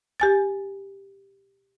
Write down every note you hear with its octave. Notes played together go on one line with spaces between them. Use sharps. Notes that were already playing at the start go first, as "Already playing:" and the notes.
G4 G#5 A6